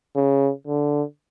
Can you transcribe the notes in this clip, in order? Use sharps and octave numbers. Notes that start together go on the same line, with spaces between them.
C#3
D3